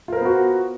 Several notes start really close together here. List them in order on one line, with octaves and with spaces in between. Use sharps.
F4 A#4 C5 B3 F#4